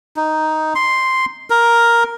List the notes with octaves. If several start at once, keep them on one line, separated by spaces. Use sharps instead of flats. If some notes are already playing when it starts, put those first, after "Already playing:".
D#4
C6
A#4